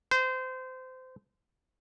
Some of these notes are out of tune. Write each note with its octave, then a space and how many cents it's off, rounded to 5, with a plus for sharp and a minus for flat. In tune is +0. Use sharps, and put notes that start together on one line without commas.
C5 -25